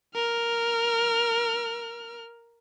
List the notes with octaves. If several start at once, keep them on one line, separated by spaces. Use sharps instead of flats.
A#4 F6